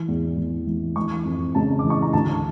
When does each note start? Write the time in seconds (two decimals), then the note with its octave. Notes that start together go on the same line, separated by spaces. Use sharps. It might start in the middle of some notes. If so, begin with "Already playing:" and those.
Already playing: E3
0.08 E2
0.37 E3
0.67 E3
0.96 E3 C#6
1.25 F2
1.55 C#3 A5
1.79 E3 D6
1.90 C#6
2.02 A#5
2.13 D2 A5